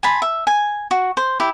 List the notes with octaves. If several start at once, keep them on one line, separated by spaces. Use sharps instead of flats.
G#5 A5 B5 C6
E5
G#5
F#4
C5
E4 G4